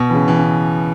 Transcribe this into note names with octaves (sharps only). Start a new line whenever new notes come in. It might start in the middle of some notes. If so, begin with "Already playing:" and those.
Already playing: B2
E3
C#3
E3
C#3